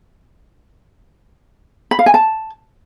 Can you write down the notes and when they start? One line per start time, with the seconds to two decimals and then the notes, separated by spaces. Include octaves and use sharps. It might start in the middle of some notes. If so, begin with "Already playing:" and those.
1.91 B5
1.99 F5
2.06 G#5
2.14 A5